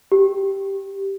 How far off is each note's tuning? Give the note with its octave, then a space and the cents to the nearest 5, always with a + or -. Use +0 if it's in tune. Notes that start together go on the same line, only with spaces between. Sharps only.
G4 -5